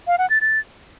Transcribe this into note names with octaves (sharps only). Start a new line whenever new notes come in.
F5
F#5
A6
A6